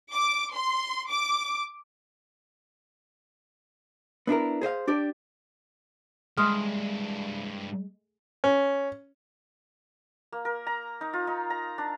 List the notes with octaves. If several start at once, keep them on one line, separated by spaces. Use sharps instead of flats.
D6
C6
D6
B3 D4 E4 A#4
G#4 C5 D#5 F5
D4 G4 D5
G2 G#3 E4 C6 D#6 F6
C#4
A#3
A#4
A#5
D#4
F4
D#4
A#5
D4